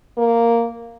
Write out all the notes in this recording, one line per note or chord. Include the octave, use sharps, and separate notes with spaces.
A#3